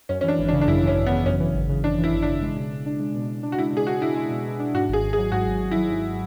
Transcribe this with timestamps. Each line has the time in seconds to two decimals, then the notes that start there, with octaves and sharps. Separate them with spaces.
0.09 F#2 C#4
0.21 C#4
0.24 E3 D4
0.39 G#1
0.48 D4
0.53 C#3
0.61 D4
0.67 F#2 E4
0.82 E3
0.87 C#4
0.96 G#1
1.07 B3
1.12 C#3
1.25 F#2 C#4
1.40 E3
1.55 G#1
1.69 C#3
1.84 F#2 D4
1.98 E3
2.04 E4
2.13 G#1
2.22 C#3 D4
2.42 G#3
2.56 B2
2.71 B2
2.86 D4
3.00 G#3
3.14 B2
3.29 B2
3.43 D4
3.52 F#4
3.58 G#3 E4
3.73 B2 G#4
3.87 B2 F#4
4.01 D4 E4
4.16 G#3
4.30 B2
4.45 B2
4.59 D4
4.74 G#2 F#4
4.89 G#1 G#4
5.04 G#1
5.13 G#4
5.18 F#3
5.32 G#2 F#4
5.46 G#1
5.61 G#1
5.71 F#3 E4
5.91 G#2